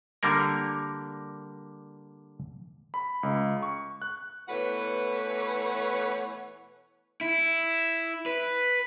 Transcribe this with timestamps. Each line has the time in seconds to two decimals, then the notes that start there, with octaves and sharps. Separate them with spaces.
0.23 D3 G3 A#3 A#4
2.94 B5
3.23 C#2
3.63 C#6
4.02 F#6
4.49 B2 E3 A3 B4 C#5 F#5
7.21 E4
8.26 B4